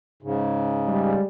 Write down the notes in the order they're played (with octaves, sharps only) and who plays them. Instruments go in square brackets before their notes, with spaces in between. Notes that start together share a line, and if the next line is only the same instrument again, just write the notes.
[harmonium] G#2 C#3
[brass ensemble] G3 G#3